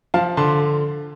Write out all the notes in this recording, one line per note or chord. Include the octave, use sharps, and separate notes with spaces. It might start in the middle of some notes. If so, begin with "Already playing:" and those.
F3 F5 A5
D3 A5 C6